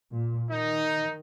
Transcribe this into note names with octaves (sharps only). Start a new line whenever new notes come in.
A#2
D#3 D#4